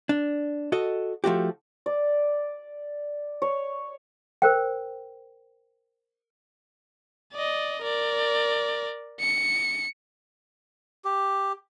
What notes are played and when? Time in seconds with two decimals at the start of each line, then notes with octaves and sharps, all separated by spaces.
0.09 D4
0.72 F#4 A4 D#5
1.24 F3 A3 F#4 G4
1.86 D5
3.42 C#5
4.42 A#4 C5 G5
7.33 D5 D#5
7.82 A#4 D5
9.20 C#7
11.05 G4